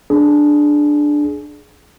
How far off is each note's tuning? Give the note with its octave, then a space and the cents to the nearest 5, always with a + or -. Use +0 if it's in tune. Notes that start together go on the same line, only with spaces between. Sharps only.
D4 +5 G#4 +20